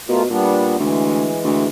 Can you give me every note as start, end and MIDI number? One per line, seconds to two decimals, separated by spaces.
0.08 0.27 47
0.08 0.22 57
0.08 0.22 65
0.08 0.22 70
0.30 0.78 46
0.30 0.76 55
0.30 0.76 59
0.30 0.76 62
0.79 1.33 38
0.79 1.67 52
0.79 1.67 56
1.44 1.67 38